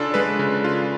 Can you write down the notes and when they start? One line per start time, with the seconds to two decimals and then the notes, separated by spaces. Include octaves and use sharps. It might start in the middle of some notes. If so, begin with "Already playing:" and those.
Already playing: C#3 D4 F4 A4
0.14 G#3 B4
0.39 C#3
0.64 F4